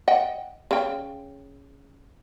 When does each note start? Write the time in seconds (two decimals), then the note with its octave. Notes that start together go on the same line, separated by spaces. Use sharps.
0.08 D#5 F#5 G5
0.71 C#3 G5